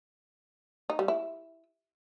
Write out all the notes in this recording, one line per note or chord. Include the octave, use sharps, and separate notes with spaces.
D#4
G3
E4